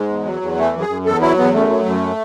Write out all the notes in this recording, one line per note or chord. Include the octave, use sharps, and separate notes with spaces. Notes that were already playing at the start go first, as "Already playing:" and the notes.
Already playing: G#2 G#3
E2
F#3
E2
E3 A3
F#2
G#4
F#2
E2 A4
F#3 E4
E2 B3
F#2 A3
F#3
F#2